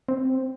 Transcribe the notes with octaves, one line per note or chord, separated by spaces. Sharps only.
C4